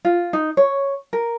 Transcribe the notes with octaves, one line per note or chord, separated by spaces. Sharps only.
F4
D#4
C#5
A#4